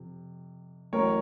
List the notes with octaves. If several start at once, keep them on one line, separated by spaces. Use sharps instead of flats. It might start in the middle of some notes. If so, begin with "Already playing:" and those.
Already playing: F2 C3
A1 A2 F#3 A#4 C#5